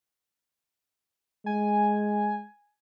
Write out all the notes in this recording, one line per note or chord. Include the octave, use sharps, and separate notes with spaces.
G#3 G#5